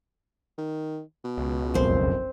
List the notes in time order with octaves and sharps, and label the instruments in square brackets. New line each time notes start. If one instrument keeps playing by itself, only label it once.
[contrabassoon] D#3
B2
[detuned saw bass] C#2
[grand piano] F#1 B1 F2 [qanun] C4 C5